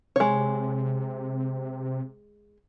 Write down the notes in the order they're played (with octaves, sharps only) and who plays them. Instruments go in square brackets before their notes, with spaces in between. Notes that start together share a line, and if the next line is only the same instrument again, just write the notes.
[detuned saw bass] C3 [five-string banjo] G#3 C#5